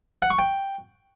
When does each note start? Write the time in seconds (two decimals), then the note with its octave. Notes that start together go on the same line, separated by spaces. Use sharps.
0.22 F#5
0.30 C#6
0.39 G5